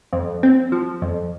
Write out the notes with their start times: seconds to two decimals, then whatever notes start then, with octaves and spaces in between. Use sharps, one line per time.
0.13 F2
0.43 C4
0.72 F3
1.02 F2